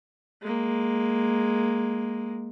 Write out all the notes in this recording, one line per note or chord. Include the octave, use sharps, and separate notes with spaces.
G#3 A#3